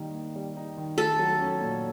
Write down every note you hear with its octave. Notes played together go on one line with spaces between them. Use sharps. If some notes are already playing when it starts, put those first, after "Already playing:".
Already playing: D#3 G3 A#3 D#4
A#3
G3
D#4
D#3
A3 A4
F#3
C#4
A#2